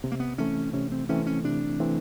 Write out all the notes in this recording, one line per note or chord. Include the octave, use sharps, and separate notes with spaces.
C3 B3
A#3
B3
E3 A3 C4 C#4
C3 C#4
C4
E3 A3 C4 C#4
C#4
C3 D4
E3 A3 C4